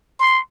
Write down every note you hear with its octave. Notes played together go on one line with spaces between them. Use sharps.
C6